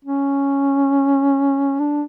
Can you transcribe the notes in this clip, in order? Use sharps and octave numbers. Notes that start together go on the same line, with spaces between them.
C#4
D4